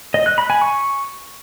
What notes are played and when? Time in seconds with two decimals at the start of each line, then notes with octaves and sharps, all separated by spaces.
0.14 D#5
0.26 F#6
0.38 B5
0.50 G#5
0.61 C#6